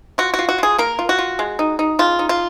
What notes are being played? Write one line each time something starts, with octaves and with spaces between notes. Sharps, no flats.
F4 F#4
F#4
F4
F#4
F4 G#4
A#3 A#4
F4
F#4
F4
G#3
D#4
D#4
C#3 F4
D#4
F4